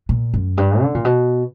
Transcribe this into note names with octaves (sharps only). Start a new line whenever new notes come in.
A#2
F#2
G2
D3
A#2
B2